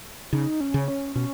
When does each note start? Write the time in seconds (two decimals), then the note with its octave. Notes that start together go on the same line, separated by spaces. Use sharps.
0.33 C#3 D#4
0.61 C#4
0.74 C#3
0.88 C#4
1.15 B2 C#4